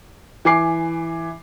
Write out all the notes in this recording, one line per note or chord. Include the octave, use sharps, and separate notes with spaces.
E3 G#5 D6 C7